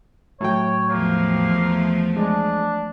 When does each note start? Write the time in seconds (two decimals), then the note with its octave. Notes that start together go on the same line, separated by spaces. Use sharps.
0.41 A2 F#3 C#5 G5
0.90 E2 F3 A3 A#3
2.17 G#3 D4